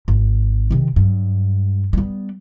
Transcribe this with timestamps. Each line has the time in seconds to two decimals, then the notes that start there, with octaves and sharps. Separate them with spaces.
0.08 G#1
0.71 C3 D#3
0.96 G2 F#3
1.93 G3 B3